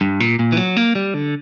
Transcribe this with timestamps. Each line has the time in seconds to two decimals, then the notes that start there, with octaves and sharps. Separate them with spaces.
0.01 G2
0.20 A#2
0.39 A#2
0.52 E3
0.57 F#3
0.77 A#3
0.95 G3
1.14 D3